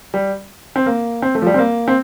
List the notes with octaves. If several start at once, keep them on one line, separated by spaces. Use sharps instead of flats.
G3
C4
A#3
C4
A3
F3
G3
C4
A#3
C4